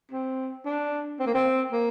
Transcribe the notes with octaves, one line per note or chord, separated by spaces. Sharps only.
C4
D4
C4
A#3
C4
A#3